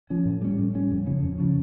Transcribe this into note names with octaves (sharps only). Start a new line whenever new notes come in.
F3 C#4
A2
G3 C#4
A2
G3 C#4
F2
C#3 F3 C#4
F2
C#3 F3 C#4